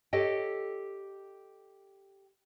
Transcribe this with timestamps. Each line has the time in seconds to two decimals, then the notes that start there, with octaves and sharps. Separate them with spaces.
0.13 G4 A4 C#5 D#5 G5